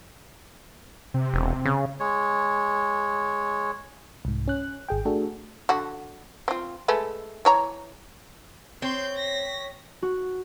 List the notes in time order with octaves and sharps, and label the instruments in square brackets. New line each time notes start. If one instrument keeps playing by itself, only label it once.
[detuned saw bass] C3
[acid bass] E1
C#3
[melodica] G#3 C#5
[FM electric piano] C2 G#2
C#4 F#6
G#1 G#4 G5
A3 D4 F#4 G#4 A4
[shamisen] D3 F#4
C4 F4
G#3 A3 B4
E3 C#5 A#5
[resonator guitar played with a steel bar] C4 [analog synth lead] C#5 [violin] C6 G6
[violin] A#6 B6
[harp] F#4